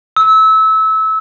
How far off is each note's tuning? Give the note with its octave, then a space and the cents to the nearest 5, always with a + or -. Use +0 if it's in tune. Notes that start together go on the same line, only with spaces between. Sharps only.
E6 -25